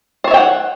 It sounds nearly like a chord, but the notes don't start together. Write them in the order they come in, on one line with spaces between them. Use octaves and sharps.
C5 C#5 E5 G5 F#5